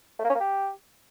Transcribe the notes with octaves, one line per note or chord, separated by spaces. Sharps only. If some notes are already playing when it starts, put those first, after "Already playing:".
A3
A#3
C#4
A#3
G4